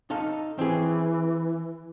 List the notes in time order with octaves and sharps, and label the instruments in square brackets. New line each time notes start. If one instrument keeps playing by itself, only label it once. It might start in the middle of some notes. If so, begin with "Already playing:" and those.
[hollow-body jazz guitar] D#4 A4 F5
[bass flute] E3 [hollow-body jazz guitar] C4 G#4